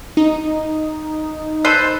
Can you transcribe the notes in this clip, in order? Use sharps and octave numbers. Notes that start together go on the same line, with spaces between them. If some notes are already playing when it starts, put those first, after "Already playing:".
D#4
A4 B4 C5